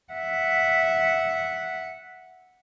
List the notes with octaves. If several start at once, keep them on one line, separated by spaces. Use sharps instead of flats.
E5 F#5